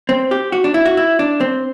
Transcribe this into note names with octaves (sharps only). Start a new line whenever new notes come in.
C4
G4
F#4
D4
E4
F#4
E4
D4
C4